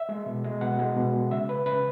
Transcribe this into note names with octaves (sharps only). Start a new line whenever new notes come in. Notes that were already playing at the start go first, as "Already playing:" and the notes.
Already playing: E5
G#3
B2
G#3
B2 F#5
G#3
B2
G#3
C#3 E5
G#3 B4
C#3 B4